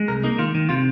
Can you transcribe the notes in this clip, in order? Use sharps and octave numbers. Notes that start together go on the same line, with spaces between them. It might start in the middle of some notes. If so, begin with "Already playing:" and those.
Already playing: G#3
C2 A#4
A#3 D#4
D#3 F4
D#3
C3 F4